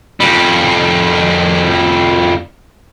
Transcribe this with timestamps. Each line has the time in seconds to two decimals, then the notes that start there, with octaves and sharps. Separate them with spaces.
0.20 F2 G3